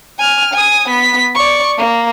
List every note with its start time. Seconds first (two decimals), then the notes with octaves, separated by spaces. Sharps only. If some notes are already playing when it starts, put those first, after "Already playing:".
0.19 G#5 F6
0.54 G#5 D#6
0.88 B3 B6
1.35 D5 C#6
1.77 A#3